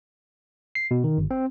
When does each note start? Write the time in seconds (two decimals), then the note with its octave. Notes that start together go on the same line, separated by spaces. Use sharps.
0.75 C7
0.91 B2
1.04 D#3
1.18 G1
1.31 C4